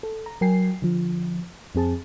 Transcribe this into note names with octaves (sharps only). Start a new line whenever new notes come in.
A4
A#5
F#3 A#4 G5 G#5 C7
D3 F3
F2 C4 G#4 A5